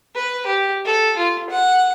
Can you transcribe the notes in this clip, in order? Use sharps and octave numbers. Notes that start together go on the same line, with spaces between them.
B4
G4
A4
F4
F#5